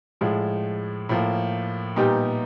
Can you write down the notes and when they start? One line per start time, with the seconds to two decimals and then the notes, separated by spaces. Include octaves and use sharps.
0.21 A2 F3 G#3
1.09 A2 F3 A#3
1.96 A#2 G3 B3 D#4 G4